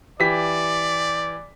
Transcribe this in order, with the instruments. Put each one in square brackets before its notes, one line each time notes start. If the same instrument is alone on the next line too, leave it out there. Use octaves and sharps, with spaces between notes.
[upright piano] E3 G4 B6 [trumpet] D5